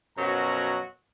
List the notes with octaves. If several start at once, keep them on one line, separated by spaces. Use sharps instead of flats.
F#2 B2 F3 F#3 F#4 A#5